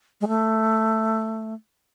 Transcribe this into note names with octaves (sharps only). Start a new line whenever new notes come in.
G#3
A3